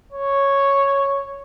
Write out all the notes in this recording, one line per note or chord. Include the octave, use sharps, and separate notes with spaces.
C#5